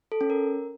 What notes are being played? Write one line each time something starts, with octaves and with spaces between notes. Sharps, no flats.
A4
C#4
A#4